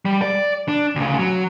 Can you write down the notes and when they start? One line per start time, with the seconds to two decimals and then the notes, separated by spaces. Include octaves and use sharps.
0.05 G3
0.22 D5
0.68 D4
0.95 D2 C#3
1.19 F#3